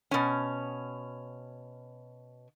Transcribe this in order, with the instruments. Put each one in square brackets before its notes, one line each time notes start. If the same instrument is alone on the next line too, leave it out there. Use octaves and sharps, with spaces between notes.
[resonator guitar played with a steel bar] B2 C#4